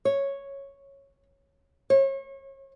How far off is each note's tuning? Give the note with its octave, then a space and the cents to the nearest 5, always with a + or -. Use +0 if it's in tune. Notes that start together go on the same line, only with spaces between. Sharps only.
C#5 -5
C#5 -35